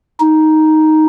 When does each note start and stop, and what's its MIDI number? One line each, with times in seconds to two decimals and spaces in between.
0.20 1.06 63